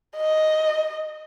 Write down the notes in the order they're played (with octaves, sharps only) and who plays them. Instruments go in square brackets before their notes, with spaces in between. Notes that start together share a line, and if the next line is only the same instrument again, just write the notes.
[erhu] D#5